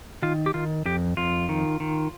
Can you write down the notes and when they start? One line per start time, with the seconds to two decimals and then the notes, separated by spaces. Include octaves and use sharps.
0.22 D#3 F4
0.46 G4
0.54 D#3 F4
0.86 F2 G4
1.17 F2 F4
1.49 D#3
1.80 D#3